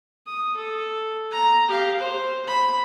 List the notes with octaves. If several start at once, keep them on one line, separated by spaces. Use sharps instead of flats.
D#6
A4
A#5
G4 F5
C5
B5